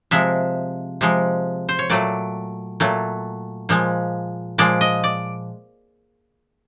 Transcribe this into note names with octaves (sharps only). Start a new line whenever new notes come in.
C3 F3 G#3 E5
C3 F3 G#3
C5
C#5
A#2 F#3 A3 D5
A#2 F#3 A3
A#2 F3 G#3
A#2 F3 G#3 D5
D#5
D5